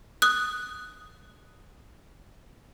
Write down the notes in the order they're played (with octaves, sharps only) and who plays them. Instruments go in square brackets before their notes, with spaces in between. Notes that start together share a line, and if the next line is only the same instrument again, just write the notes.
[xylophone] D#6 F#6